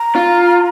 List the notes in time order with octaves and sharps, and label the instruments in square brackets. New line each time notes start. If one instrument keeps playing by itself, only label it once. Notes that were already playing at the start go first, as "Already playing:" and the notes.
Already playing: [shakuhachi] A#5
[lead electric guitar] F4